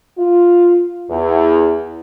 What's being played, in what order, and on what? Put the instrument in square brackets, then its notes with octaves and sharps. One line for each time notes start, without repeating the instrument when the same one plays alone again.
[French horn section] F4
E2